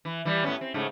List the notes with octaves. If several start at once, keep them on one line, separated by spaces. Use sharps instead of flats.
E3
E3 G3
A2 B3 C#4
C4
G#2 C#3 A3